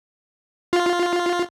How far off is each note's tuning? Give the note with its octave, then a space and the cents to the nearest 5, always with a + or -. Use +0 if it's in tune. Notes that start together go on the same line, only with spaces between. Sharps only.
F4 +5